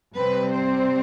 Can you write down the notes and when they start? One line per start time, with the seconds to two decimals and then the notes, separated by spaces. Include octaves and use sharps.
0.15 C3 G3 C4 B4
0.53 C5